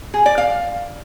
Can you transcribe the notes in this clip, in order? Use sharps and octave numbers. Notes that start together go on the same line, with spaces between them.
G#4
D5
F5